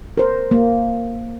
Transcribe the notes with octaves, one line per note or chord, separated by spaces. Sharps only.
A#4 C5
A#3